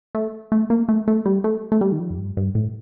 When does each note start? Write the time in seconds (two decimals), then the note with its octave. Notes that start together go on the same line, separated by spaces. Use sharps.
0.15 A3
0.52 A3
0.70 A#3
0.89 A3
1.08 A3
1.26 G3
1.44 A3
1.72 A3
1.81 G3
1.92 D#3
1.99 F3
2.10 F2
2.18 G2
2.37 G2
2.55 A2